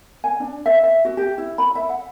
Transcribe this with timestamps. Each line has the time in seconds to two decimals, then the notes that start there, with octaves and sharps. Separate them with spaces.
0.24 G#5
0.40 D4
0.66 E5
0.84 E5
1.05 F#4
1.17 G4
1.38 E4
1.58 B5
1.75 E5
1.89 F#5